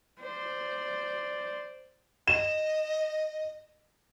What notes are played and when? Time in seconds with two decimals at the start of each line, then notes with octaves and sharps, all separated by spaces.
0.21 C5 D5
2.28 D#5 E7